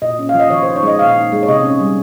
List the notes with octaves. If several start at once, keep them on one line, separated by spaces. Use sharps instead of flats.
A#2 D#5
C#4
F5
F3
D#5
D#3 C#5
C5
D#4
C#5
G#3 D#5
A#2 F5
D#4
G#3
C#5
C3 D#5
C#4
G3